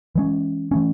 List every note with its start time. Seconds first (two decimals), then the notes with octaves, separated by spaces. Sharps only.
0.15 E3 G#3 C#4
0.71 E3 A3 C#4